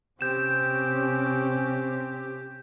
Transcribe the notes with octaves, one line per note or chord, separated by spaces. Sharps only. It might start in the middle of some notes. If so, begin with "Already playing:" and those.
C3 C4 C#4 G4 G6 E7